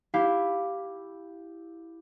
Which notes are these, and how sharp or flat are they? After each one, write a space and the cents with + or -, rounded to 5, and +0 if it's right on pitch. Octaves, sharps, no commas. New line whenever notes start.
E4 +0 G4 +0 F5 +0